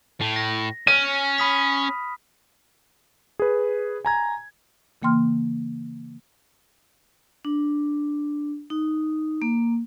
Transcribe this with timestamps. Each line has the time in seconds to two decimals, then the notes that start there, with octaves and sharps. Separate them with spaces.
0.21 A2
0.36 A#6
0.87 C#4 F6 D#7
1.38 B5 D#6 B6
3.39 G#4 B4
4.05 G#5 A#5 G#6
5.02 C#3 E3 A#3 G5 C6 F6
7.45 D4
8.70 D#4
9.42 A#3